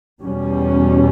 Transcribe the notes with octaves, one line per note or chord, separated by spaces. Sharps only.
E2 B2 G3 C#4